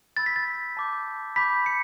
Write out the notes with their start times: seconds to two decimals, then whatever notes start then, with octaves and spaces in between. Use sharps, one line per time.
0.17 B5 E6 G6 A6
0.26 B6
0.36 A6
0.77 A5 D6 G6
1.36 B5 D6 G6 B6
1.66 C#7